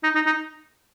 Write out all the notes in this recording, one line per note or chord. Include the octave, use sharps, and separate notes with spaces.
D#4
D#4
D#4